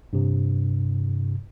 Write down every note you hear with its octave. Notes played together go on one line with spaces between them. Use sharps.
G2 C3